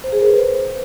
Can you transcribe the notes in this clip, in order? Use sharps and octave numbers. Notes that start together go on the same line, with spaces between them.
C5
G#4
A#4
B4
C5